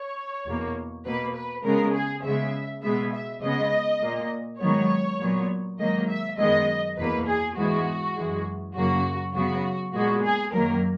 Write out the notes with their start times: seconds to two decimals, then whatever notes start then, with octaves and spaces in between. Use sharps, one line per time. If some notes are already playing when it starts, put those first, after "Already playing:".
Already playing: C#5
0.45 E2 B2 A#3
1.05 B2 A#3 B4
1.34 B4
1.63 C#3 G#3 B3 A#4
1.93 G#4
2.23 C#3 G#3 B3 E5
2.82 B2 G#3 B3 E5
3.12 E5
3.41 C#3 G#3 B3 D#5
4.01 A#2 A#3
4.60 G#2 D#3 F#3 B3 C#5
5.19 A#2 F#3 B3
5.79 G#2 D#3 F#3 A#3 D#5
6.08 E5
6.38 F#2 D#3 G#3 B3 D#5
6.97 E2 B2 A#3 B4
7.27 G#4
7.56 G#2 E3 G#3 B3 F#4
8.15 F#2 E3 G#3
8.75 F#2 C#3 F#3 A#3 F#4
9.34 F#2 C#3 F#3 B3 F#4
9.93 A#2 G#3 B3 F#4
10.23 G#4
10.52 F#2 D#3 F#3 A#3 A#4